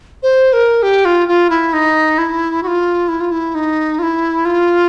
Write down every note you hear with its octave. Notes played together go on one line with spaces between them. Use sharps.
C5
A#4
G4
F4
F4
E4
D#4
E4
F#4
F4
E4
F4
E4
D#4
F4
E4
F4